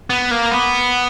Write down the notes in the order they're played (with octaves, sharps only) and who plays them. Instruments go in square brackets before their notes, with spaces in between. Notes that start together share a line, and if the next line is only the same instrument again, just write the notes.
[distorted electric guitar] B3
A#3
B3